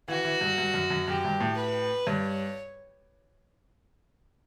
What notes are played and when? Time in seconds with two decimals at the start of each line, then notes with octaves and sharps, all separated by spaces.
0.08 E3 F#4
0.24 E3
0.41 G2
0.58 G2
0.74 F#2
0.90 F#2
1.08 F#2 G4
1.25 G2
1.40 A2
1.57 B4
2.07 G2 C#5